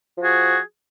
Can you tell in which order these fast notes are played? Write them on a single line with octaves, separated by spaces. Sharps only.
F3 G#4 F#4